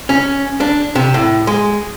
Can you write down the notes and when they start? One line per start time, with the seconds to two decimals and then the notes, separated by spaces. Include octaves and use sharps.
0.09 C#4
0.60 D4
0.95 C3
1.14 A2
1.47 G#3